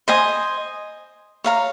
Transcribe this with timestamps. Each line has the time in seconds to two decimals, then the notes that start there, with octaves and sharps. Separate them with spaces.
0.08 C5 D#5 G#5 D#6
1.44 C#5 F5 A#5